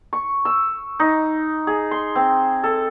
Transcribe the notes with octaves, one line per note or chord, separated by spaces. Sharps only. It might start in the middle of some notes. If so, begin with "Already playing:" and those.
C#6
E6
D#4
G#4
C6
C4
A4